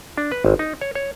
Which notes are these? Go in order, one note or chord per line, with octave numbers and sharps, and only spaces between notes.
D4
B4
G#1
D#4
C#5
C#5